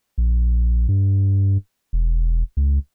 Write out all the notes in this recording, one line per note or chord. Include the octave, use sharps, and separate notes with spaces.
A#1
G2
E1
C#2